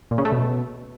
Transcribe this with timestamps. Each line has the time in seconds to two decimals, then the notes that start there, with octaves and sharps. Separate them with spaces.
0.11 A#2
0.18 C#3
0.25 A3
0.32 B2